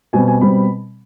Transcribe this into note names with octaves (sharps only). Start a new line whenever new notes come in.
B2 G3 C4 G#5
G#5
B2 G3 C4 B5